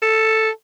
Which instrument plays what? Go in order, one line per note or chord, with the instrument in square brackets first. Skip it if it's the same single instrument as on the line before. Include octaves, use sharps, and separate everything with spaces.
[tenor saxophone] A4